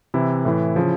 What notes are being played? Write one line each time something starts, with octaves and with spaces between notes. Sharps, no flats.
C3 E3 E4
A2 E3
C#3 F3